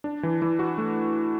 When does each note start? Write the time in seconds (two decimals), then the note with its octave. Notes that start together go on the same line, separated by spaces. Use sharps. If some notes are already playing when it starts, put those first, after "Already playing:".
0.04 D4
0.23 E3
0.42 E3
0.59 F#4
0.78 A3